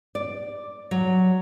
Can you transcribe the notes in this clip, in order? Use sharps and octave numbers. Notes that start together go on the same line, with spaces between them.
D5
F#3